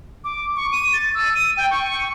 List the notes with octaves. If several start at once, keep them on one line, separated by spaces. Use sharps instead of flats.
D6
C#6
D#7
A6
E6
D#7
G5
C#6